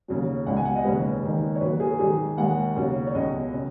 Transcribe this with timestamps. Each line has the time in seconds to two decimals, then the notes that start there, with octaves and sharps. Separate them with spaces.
0.08 D#2 C#3 F#3
0.47 C#2 B2 G#3 F#5
0.57 G#5
0.65 F#5
0.75 D#5
0.85 D#2 C#3 G#3 B4
1.24 D#2 D#3 G#3
1.55 C#5
1.61 D#2 D#3 F#3 B4
1.80 G#4
1.99 G#2 D#3 G#3 G#4
2.37 D#2 D#3 G#3 F#5
2.76 D#2 C#3 F#3
3.07 C#5
3.15 C#2 B2 G#3 D#5
3.54 C#3